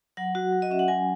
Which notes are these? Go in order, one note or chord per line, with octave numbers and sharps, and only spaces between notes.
F#3 F#5
F#4
F#3
D#5
C#4 E5
F#5
F#3 G#5